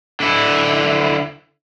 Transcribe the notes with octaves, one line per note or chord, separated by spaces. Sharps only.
D3 E4